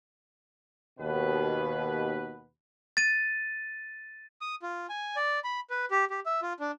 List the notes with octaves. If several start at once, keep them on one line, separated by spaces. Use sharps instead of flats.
D#2 B2 B4
A6 D#7
D#6
F4
G#5
D5
B5
B4
G4
G4
E5
F4
D4